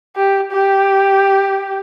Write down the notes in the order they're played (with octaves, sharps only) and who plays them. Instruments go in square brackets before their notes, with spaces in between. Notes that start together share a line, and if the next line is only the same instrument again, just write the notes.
[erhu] G4
G4